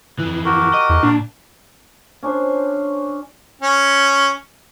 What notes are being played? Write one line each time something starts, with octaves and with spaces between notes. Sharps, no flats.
F2 E3
F#4 G4 A#4
D#5
E2
A#2 D4
C#4 D4 C5
C#4